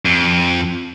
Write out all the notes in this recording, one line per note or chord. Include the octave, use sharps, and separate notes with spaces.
F2